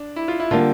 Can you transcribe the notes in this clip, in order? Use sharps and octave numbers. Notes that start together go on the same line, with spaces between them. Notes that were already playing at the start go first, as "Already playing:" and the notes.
Already playing: D4
E4
F4
E4
D3 G3 A#3 F4